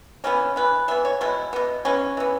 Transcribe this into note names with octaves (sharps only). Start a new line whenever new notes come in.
C#3 E3 B3 C#4
E3 G#3 B3 B4
E3 B3 E5
C#5
B2 G#3 B3 E4
B2 B3
E3 G#3 B3 C#4
E3 B3